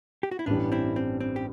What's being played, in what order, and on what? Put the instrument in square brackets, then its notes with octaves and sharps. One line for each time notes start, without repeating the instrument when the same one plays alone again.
[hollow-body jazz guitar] G4
F#4
E4
[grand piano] A1 G2 E3 G3 [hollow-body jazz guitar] B3 D4
[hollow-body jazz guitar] C4 E4
C4
C4
G4